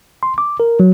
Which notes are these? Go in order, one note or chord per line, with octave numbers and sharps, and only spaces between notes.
C6
D6
A#4
F#3